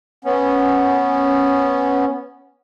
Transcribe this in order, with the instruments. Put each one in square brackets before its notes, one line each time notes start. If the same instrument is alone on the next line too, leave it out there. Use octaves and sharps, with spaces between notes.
[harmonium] B3 C#4